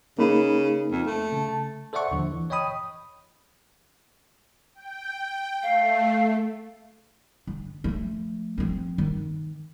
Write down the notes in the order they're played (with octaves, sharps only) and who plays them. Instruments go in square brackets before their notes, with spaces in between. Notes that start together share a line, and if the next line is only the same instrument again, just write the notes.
[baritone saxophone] C#3 [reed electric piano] A#3 D#4 B5
[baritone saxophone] F2
A3
[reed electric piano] C#3 A5
A5
[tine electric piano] A4 C5 D5 E5 F#5 C#6
D#2 D3 F3
E3
C#5 D#5 G5 B5 D#6
[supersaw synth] G5
[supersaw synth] A3 [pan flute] F5
[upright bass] D3
F3 A3
F3 C4
D#3